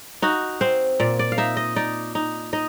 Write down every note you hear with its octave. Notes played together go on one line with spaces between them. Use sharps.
D#4 F#4
C4 C5
A#2 D5
D5
F5
D#4 E5
D#5
D#4 D5
D#4
D#4 D#5